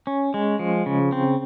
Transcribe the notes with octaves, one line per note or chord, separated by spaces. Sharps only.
C#4
G#3
F3
C#3
C4